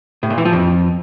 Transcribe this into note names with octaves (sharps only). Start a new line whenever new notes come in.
A2
A#2
E3
F3
F2